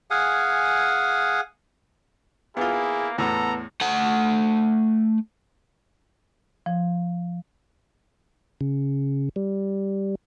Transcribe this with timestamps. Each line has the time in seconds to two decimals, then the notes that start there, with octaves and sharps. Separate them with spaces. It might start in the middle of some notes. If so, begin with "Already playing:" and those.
0.11 G#4 F5 F#5 G#5
2.57 A#3 B3 E4 F4 G#4
3.18 E2 A2 B3 A4 A#5
3.81 A3 F#5
6.66 F3
8.61 C#3
9.36 G3